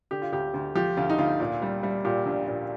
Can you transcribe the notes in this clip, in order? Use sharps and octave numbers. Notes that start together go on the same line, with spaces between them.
D3 G4
F4
D2 G4
D2
F3 G4
D2 F4
D#4
D2 F4
A#2
G3
G3
A#2 G4
A#1
A#2